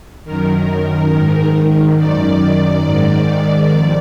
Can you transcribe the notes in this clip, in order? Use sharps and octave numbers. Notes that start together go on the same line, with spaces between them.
F#2 D#3 A#4
G#2 D#3
F#2 D#3 D5
G#2 D#3
F2